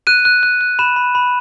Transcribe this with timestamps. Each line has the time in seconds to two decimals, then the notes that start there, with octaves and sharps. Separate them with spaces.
0.07 F#6 D#7
0.25 F#6
0.43 F#6
0.61 F#6
0.79 B5 E7
0.96 B5
1.15 B5